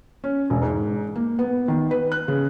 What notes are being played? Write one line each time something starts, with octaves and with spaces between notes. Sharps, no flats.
C#4
E1
G#2
A#3
B3
D#3
B4
F#6
C#3